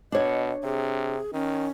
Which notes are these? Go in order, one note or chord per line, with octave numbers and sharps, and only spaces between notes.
B2 D4 C#5 D#5
C3 G#4
D#3 C#4